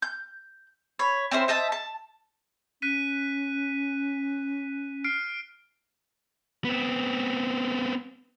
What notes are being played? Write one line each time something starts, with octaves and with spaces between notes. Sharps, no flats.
G6
C#5 B5
C4 C#4 E4 C5
C5 D#5 E5 A5
A5
C#4 F#6 B6 D#7
F6 C7 D7
B3 C4